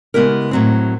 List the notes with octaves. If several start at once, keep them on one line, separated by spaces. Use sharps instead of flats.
C#3 G#3 B3 E4 G4 A#4
A2 F#3 C4